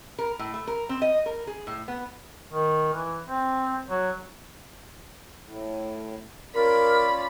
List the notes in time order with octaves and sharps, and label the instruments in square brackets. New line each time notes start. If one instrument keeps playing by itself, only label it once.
[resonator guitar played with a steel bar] A#4
A2
A3
A#4
C4
D#5
A#4
G#4
A2
B3
[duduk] D#3
E3
C4
F#3
[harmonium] A2
[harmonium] C#4 F4 D5 [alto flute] A#4 [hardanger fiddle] B5